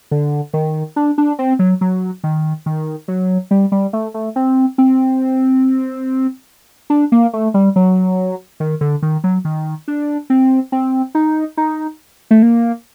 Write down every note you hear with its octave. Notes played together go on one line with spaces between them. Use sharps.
D3
D#3
D4
D4
C4
F#3
F#3
D#3
D#3
F#3
G3
G3
A3
A3
C4
C4
D4
A#3
A3
G3
F#3
D#3
D3
D#3
F#3
D#3
D4
C4
C4
D#4
D#4
A3
A#3